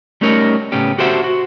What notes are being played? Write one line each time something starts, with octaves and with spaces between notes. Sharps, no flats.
G3 A3 C#4 D#4 A#4 C#5
A2 C#3 A3 B3 C#4 G4
F#4 G4 A4 C5 E5 F#5
F#4